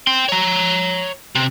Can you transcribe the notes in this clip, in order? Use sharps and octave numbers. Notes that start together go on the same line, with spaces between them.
G5 C6
C#5 A#5
C3